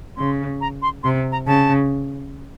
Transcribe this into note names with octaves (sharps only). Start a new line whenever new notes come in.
C#3 C6
A#5
C6
C3 C6
A#5
C#3 A5